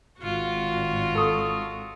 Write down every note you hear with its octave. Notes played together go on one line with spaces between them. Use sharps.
G#1 F4 F#4
A4 C#6 D#6